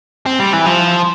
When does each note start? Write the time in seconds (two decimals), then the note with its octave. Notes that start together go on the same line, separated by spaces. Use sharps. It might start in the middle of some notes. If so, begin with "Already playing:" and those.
0.26 C4
0.40 G3
0.53 E3
0.66 F3